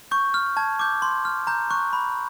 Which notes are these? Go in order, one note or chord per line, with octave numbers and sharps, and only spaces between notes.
C#6 G6
F6
A5 G#6
D6 G6
C6
F6
A#5 G6
C#6 F#6
B5